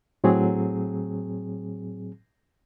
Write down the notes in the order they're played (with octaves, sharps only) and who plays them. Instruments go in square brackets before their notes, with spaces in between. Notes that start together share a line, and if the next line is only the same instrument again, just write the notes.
[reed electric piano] A2 F#3 C4 G#4